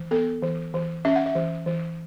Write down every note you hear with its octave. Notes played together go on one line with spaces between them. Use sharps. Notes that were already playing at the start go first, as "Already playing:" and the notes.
Already playing: E3
B3 A4
E3
E3
C#4 E5
F#5
E5
E3
E3